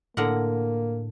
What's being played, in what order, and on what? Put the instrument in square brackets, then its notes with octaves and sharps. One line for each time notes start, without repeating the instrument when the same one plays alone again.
[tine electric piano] A2 [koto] D3 A#4 F#5 [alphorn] A#3